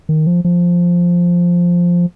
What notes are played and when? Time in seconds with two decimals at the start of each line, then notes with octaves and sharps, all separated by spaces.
0.09 D#3
0.27 F3
0.45 F3